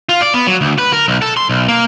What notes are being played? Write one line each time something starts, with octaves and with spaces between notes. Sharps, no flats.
F4
D5
B3
F#3
D2
B4
A#4
B1
A4
C6
B1
A#3